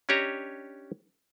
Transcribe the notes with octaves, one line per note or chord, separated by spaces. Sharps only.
C#4 D4 G4 C#5 D#5 A#5